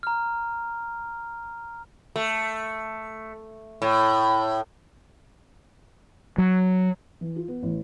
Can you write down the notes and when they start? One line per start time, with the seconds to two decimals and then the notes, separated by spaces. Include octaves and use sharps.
0.03 A#5 F6
2.16 A3
3.82 A2
6.38 F#3
7.21 E3
7.36 F4
7.48 B3
7.63 A1